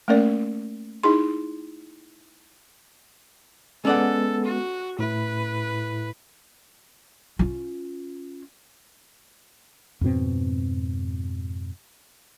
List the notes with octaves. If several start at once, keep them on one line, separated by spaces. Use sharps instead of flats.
A3 A#3 C#4 A#4 D5
D#4 E4 G#4 C6
G#3 B3 C#4 A4 D5 F#5
F#4
A2 E4 B4
C#4 F4
F2 G#2 B2 C4